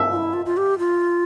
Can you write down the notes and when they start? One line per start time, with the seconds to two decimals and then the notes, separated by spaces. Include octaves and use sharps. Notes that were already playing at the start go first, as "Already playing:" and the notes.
Already playing: E5
0.11 F4
0.16 E4
0.33 F4
0.46 F4
0.57 G4
0.79 F4